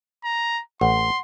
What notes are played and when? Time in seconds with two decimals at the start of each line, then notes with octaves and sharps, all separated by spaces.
0.24 A#5
0.81 A1 F#5 C6